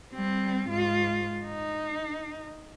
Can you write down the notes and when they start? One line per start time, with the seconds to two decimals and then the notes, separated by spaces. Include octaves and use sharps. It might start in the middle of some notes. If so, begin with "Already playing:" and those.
0.14 G3 C4
0.69 G#2 F4
1.45 D#4